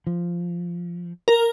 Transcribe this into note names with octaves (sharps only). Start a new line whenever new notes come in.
F3
A#4